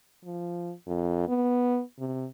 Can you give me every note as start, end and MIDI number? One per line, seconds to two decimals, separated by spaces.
0.25 0.73 53
0.87 1.25 41
1.28 1.81 59
1.99 2.27 48